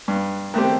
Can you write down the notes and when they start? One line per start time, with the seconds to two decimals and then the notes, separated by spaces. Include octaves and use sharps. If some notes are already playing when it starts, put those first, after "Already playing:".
0.08 G2
0.54 D#3 A3 C4 G4